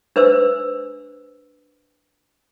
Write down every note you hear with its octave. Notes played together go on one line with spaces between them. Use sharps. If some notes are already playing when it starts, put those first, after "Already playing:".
D4 B4 C5 E6